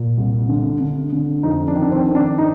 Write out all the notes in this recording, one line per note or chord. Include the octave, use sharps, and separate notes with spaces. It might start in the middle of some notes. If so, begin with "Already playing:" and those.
Already playing: A#2
C2
D3
D3
D3
F2 D#4
D4
D#3
D4
C4
D#3
D4
D#4